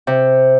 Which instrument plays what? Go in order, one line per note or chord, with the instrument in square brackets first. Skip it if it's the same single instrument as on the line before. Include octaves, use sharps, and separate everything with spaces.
[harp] C3